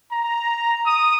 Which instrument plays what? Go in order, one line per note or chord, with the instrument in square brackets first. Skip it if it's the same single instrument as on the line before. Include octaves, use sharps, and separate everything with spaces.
[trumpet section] A#5
D#6